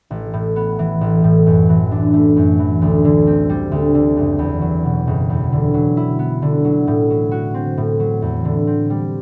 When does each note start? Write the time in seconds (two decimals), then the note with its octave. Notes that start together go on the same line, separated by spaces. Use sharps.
0.11 A1
0.34 A2
0.56 B3
0.79 E3
1.01 A1
1.24 A2
1.46 F#2
1.69 E3
1.91 D4
2.13 A3
2.36 F#2
2.59 E3
2.82 D2
3.05 D3
3.27 C4
3.49 G3
3.72 D2
3.94 D3
4.17 F#1
4.39 E2
4.61 F#3
4.85 B2
5.07 F#1
5.29 E2
5.52 D3
5.74 F#3
5.97 E4
6.19 B3
6.42 D3
6.65 F#3
6.87 A2
7.10 F#3
7.31 F#4
7.54 C4
7.78 A2
8.00 F#3
8.22 E2
8.45 D3
8.67 C4
8.90 G3